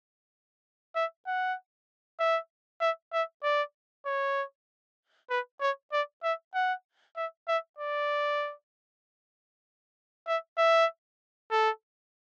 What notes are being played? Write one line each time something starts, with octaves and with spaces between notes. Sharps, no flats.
E5
F#5
E5
E5
E5
D5
C#5
B4
C#5
D5
E5
F#5
E5
E5
D5
E5
E5
A4